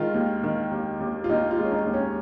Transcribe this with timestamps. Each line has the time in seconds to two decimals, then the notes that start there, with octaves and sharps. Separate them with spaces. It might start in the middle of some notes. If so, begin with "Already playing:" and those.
Already playing: D#3 G#3 F4
0.14 D#2
0.43 D#3
0.71 D#2
1.00 D#2
1.24 F4
1.29 D#2 D#4
1.51 F4
1.58 G#3
1.64 C#4
1.72 D#4
1.86 D#2
1.93 C#4